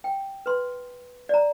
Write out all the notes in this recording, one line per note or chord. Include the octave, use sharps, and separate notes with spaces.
G5
B4 C6
D5 A#5